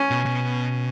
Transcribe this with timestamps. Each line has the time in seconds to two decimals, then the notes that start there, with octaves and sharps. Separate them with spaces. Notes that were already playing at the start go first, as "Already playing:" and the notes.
Already playing: C#4
0.11 B2
0.25 B2